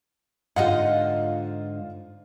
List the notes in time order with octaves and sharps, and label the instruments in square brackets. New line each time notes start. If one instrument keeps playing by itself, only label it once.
[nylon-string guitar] G#2 D3 [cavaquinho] D#4 D#5 F#5 [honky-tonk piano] F4 F5